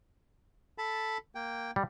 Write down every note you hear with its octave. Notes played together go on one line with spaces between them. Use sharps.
A4 A5 B5
A#3 G5
G3